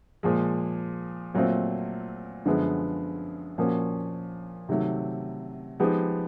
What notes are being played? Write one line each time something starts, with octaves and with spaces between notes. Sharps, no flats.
A#2 F3 G#3
A#2 F#3 A3 C4 F4
F#2 D3 F3 G#3 B3
A#2 F3 A#3 C#4 F#4
C3 D#3 F#3 A3
F3 G#3 B3 D#4 G4